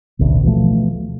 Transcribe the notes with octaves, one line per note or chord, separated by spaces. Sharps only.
A1 D2 B2
B2 E3 F3 A3